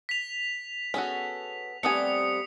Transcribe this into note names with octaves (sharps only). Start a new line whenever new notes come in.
B6 F7
B3 C#4 F#4 G#4 A4
G3 A3 B3 C4 G#5 D#6 C#7